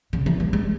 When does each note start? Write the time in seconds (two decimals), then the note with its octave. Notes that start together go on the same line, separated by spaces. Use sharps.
0.13 C#3
0.26 E3
0.40 G3
0.53 G#3